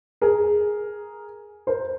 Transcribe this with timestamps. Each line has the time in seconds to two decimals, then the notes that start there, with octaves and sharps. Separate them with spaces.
0.21 G#4 A#4
1.67 A#4 C5